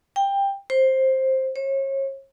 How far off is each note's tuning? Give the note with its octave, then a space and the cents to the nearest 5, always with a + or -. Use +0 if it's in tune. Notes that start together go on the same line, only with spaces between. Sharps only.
G5 +15
C5 +10
C#5 -35